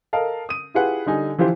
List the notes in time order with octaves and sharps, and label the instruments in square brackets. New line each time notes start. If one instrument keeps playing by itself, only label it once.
[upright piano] A4 A#4 D#5 F5 A5
D#6 D#7
E4 F4 G4 G#4 B4 F#5
D3 G3 D#4 G#5
E3 F3 E4 G4 C5